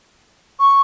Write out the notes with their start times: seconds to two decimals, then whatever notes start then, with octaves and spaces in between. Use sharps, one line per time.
0.59 C#6